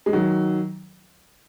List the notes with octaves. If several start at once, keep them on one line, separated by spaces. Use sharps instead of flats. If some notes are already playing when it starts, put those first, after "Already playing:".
G#3
D#3 F#3